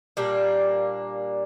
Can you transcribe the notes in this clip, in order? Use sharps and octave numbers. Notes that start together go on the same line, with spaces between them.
A#2 G3 A#3 D4